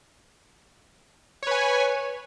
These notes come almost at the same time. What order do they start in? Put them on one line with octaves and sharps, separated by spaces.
C#5 B4 G#5